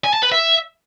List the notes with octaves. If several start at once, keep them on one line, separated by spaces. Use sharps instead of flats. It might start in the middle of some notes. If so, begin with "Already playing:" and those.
G#5
A5
B4
E5